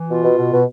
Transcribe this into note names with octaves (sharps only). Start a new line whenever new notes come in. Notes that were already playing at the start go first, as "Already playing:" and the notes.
Already playing: E3
B2 F4
B2
B2
B2